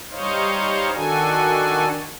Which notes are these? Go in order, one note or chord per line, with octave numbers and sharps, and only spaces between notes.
G3 D#4 C5 C#5 D#5 F5
D#3 D4 F#4 A4 G#5